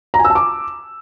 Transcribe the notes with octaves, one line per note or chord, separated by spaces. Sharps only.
A#5
G#5
E6
A5
D6